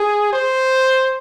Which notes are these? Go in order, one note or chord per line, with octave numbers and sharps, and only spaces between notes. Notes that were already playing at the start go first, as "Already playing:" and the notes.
Already playing: G#4
C5